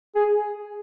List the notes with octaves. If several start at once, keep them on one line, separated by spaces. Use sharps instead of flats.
G#4